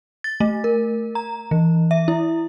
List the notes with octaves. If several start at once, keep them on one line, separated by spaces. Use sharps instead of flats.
A6
A3
A#4
A#5
E3
E5
E4